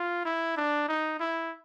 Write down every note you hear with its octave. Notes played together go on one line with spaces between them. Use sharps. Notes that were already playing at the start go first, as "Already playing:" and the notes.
Already playing: F4
E4
D4
D#4
E4